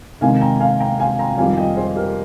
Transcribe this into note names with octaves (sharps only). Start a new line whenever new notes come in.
C3 D#3 G#3 F5 G#5
G5 A#5
F5 G#5
G5 A#5
F5 G#5
G5 A#5
F2 D#3 G3 F5 G#5
D#5 G5
G#4 C5
G4 A#4